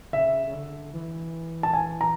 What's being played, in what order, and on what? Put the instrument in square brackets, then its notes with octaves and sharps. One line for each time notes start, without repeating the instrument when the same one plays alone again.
[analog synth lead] C#3 [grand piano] E5
[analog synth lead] C#3
D3
E3
[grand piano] A5
G#5
A#5